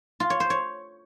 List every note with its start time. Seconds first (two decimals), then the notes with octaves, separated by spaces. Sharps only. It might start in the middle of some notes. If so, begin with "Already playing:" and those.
0.20 F4
0.30 C#5
0.40 C5
0.50 C#5